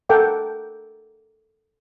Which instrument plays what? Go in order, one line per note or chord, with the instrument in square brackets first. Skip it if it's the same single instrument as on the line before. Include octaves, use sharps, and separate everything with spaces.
[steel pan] A4 A#4 F#5 G5 D6